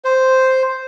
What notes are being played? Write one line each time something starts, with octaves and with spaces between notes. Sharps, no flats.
C5